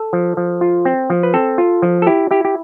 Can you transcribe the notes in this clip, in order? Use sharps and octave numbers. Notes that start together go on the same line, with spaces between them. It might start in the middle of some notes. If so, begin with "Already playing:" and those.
Already playing: A4
F3
F3
F4
C4
F3
B4
C4 A4
F4
F3
A4
E4 G4
E4 G4
G4